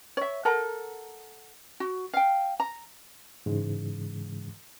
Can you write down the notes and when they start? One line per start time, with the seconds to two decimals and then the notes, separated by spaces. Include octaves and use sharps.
0.17 C#5 E5
0.45 A4 A#4 F#5 A#5
1.80 F#4
2.14 F5 G5
2.60 A#5
3.46 G#2 C#3 E3 G#3